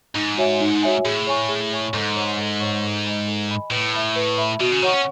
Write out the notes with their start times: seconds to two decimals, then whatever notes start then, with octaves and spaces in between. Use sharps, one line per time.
0.15 G#2 D#4
0.38 F#4 C#5 E5 G#5
0.60 D#4
0.83 F#4 C#5 E5 G#5
1.05 A2 G#4
1.27 C#5 G#5 C#6
1.49 G#4
1.71 C#5 G#5 C#6
1.93 G#2 A4
2.15 C#5 F#5 C#6
2.38 A4
2.60 C#5 F#5 C#6
2.82 A4
3.04 D#5 G#5 B5
3.27 A4
3.49 D#5 G#5 B5
3.71 A2 B4
3.94 E5 B5
4.16 B4
4.38 E5 B5
4.60 B2 F#4
4.72 C#3
4.82 D#3 C#5 F#5 C#6
4.93 C#4